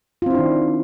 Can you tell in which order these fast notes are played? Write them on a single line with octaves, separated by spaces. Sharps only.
F4 C4 E4 D4 D#3